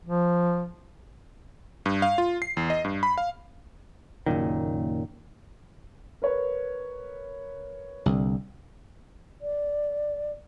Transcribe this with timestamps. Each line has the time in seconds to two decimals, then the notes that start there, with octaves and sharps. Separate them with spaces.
0.05 F3
1.86 G2
2.02 F5
2.18 F4
2.42 C7
2.57 E2
2.70 D#5
2.85 G2
3.03 B5
3.18 F5
4.26 F#1 F#2 A#2 D#3
6.22 A#4 B4 C#5
8.06 C2 D3
9.41 D5